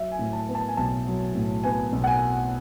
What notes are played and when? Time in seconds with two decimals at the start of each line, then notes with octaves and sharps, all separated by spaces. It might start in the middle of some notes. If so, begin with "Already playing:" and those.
Already playing: F#3 E5
0.12 G#5
0.19 A2
0.33 A5
0.48 B3
0.55 A5
0.68 G#5
0.77 B1 A5
1.06 F#3
1.35 A2
1.64 B3 G#5
1.93 B1
2.04 F#5
2.07 G#5